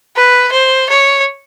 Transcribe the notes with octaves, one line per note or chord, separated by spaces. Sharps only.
B4
C5
C#5